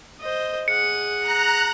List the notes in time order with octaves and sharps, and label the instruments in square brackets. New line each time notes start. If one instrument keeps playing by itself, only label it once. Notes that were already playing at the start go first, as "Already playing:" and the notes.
[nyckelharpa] C5 D#5
[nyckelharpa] G#4 F#5 [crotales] C#7
[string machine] A#5 F#6